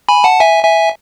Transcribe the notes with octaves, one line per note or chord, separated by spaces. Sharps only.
G#5 B5
F#5 A5
E5 G#5
E5 G#5